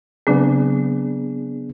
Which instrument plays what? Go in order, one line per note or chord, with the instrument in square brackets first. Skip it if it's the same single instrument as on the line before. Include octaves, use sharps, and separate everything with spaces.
[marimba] C#3 F#3 C4 [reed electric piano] B3 D4 G#4